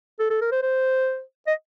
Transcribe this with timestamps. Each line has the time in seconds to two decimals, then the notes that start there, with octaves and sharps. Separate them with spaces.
0.19 A4
0.30 A4
0.41 A#4
0.52 C5
0.62 C5
1.47 D#5